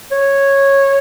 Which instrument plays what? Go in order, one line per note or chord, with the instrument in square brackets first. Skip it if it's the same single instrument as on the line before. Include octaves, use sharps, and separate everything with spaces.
[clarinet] C#5